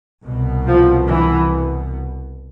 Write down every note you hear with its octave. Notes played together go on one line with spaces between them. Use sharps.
C2 B2
F3
E3